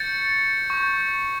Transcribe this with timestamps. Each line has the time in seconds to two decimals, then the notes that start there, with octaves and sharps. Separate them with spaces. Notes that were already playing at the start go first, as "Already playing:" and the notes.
Already playing: C#6 G6 A6 C#7
0.70 C#6 G6